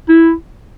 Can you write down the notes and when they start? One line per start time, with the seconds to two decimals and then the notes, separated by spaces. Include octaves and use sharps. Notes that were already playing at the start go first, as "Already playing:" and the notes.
0.08 E4